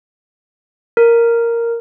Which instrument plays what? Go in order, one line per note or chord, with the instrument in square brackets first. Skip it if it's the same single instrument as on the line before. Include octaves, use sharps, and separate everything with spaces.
[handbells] A#4